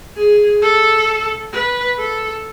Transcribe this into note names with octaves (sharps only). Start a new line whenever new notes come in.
G#4
A4
B4
A4